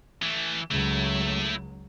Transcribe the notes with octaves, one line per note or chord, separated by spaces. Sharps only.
E3 A3
C#2 F#3 A3 E4